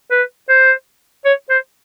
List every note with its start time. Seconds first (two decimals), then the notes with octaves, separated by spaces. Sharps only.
0.11 B4
0.49 C5
1.25 C#5
1.50 C5